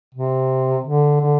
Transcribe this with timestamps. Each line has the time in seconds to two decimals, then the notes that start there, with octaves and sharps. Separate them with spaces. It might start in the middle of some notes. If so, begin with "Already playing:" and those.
0.15 C3
0.84 D3
1.20 D3